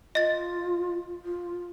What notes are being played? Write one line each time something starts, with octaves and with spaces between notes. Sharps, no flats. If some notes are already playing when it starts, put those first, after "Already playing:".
F4 D#5 A6
F4